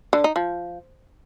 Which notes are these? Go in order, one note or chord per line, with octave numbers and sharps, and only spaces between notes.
D3
D#4
F3